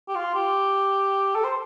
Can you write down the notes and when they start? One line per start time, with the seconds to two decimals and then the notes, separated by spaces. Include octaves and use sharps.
0.09 G4
0.16 F4
0.35 G4
1.35 A4
1.44 C5